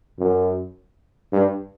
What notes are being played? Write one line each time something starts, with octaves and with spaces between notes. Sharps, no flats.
F#2
G2